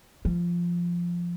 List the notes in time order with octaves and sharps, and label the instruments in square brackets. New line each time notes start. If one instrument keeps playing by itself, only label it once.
[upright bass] F3